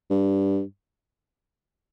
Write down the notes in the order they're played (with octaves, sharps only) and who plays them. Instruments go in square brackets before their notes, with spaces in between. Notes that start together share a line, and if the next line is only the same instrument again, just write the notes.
[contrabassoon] G2